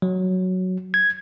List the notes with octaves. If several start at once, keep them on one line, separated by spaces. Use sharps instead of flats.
F#3
G#6